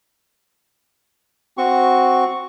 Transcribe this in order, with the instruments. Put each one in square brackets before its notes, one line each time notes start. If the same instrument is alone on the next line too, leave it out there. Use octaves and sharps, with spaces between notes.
[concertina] C4 F#4 C#6